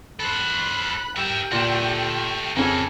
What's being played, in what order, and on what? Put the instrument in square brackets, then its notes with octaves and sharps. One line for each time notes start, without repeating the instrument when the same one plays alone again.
[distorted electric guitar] A4 C5 [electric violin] B5 F#6
[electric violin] G4 G5 [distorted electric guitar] A#4 E5
[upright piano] A#2 [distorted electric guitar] A3 F#4
[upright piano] F2 C#3 [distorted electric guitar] A#3 A4 [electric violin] G#5